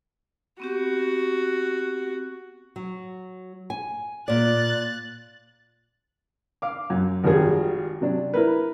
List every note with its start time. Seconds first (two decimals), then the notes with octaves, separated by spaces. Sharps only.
0.60 B3 C4 F#4 G4
2.76 F#3
3.70 G#5
4.28 A#2 D5 F#6 A6
6.62 F5 D6
6.90 F#2
7.24 G#1 D#3 F3 G3 G#4
8.01 C3 F#3 D4
8.34 E4 A#4 B4